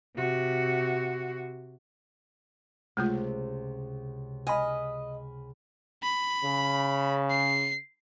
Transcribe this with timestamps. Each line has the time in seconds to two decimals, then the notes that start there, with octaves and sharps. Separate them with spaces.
0.16 C3 F#4
2.97 C#2 C3 G#3 A3 F4
4.47 D#5 G#5 B5 F6
6.03 B5
6.43 C#3
7.30 C7